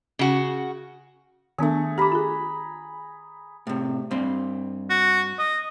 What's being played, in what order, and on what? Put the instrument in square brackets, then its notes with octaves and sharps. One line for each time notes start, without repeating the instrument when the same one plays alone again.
[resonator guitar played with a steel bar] C#3 F#4
[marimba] D#3 B3 D4 [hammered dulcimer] A3 G#4
[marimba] G4 D6 [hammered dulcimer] A#5 B5
[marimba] F4 G#4
[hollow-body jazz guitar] A2 C3
G2 C4
[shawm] F#4
D#5